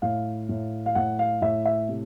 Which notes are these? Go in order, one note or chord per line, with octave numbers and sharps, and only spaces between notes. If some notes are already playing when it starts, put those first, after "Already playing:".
A2 F5
A2
F5
A2 F#5
F5
A2 E5
E5
C3